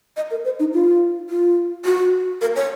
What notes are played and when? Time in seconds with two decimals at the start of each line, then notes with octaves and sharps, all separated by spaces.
0.17 D#5
0.31 A#4
0.45 C5
0.59 D#4
0.74 F4
1.29 F4
1.85 F#4
2.41 A#4
2.56 C#5